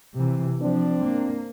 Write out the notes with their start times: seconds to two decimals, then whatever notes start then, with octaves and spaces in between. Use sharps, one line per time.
0.15 C3 E3
0.61 F3 C4 D4
1.04 A#3